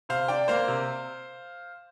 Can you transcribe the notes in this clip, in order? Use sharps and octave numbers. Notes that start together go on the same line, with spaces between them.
C3 C5 F5
D4 D5 G5
A#3 C5 F5
C3